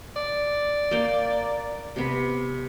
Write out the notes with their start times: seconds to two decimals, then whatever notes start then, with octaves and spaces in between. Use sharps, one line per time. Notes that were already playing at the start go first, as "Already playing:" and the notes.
0.16 D5
0.91 A#3 G5
1.96 C3 B3